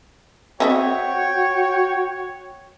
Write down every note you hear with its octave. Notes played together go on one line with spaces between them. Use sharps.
C4 F#4 C#5 D#5 E5 G5